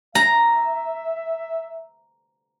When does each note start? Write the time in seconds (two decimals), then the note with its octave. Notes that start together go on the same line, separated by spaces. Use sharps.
0.15 E5 A#5